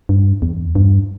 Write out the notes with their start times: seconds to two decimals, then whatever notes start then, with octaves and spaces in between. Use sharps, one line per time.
0.09 G2
0.42 E2
0.75 G2